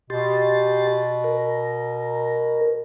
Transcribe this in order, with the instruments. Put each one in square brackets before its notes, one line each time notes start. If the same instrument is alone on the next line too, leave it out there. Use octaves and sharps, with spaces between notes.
[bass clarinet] B2 [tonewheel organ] G4 C6 A6
[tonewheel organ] A#4